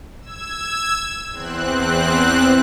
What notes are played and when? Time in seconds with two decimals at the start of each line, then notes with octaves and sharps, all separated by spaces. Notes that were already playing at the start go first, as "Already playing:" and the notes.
0.21 E6 G#6
1.31 E2 C4 F#6